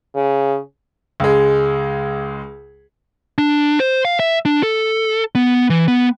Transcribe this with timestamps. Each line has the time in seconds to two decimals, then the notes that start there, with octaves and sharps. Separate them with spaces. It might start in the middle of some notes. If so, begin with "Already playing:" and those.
0.14 C#3
1.20 C#2 G#3
3.38 D4
3.80 C5
4.05 F5
4.20 E5
4.45 D4
4.63 A4
5.35 B3
5.70 E3
5.88 B3